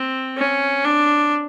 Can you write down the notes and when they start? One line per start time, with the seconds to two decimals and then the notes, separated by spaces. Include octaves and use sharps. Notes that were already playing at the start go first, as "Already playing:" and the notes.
Already playing: C4
0.37 C#4
0.84 D4